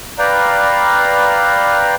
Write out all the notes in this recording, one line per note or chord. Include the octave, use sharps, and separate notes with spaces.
B4 D5 F5 G5 A#5